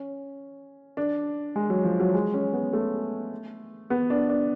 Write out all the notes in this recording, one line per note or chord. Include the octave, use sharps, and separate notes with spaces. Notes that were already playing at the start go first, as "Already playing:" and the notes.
Already playing: C#4
D4
G#3
F#3
F3
F#3
G#3
C#4
B3
A3
B3
D4
D4